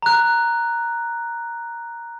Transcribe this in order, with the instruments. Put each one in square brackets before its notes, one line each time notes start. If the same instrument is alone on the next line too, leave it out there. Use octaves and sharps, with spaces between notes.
[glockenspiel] A#5 F#6